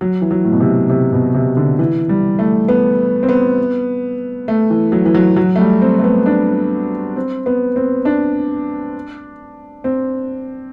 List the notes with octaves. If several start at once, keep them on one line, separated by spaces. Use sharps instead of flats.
F#3
E3
F#3
A2
B2
C3
C3
B2
C3
D3
E3
G3
A3
B3
C4
B3
A3
E3
F#3
E3
F#3
F#3
A3
G3
C4
A3
B3
D4
C4
B3
C4
D4
C4